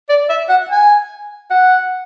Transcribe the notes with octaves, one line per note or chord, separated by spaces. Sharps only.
D5
E5
F#5
G#5
F#5